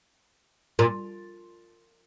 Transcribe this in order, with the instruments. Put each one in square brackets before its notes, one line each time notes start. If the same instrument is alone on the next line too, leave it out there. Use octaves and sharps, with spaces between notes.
[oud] A#2